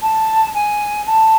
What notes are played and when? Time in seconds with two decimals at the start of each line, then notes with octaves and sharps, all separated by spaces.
0.02 A5
0.54 G#5
1.06 A5